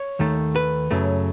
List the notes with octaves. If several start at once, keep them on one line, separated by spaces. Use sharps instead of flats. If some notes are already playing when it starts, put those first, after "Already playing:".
Already playing: C#5
D#2 D#3 A3
B4
F#2 C#3 F#3 A3